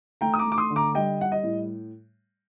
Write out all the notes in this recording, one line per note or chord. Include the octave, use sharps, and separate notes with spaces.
A3 G5 A#5
D#6
A#5 D6
A3
D6
C6 D#6
D3
A#5 D6
G3 D#5 G5
G3 F#5
D#5
A2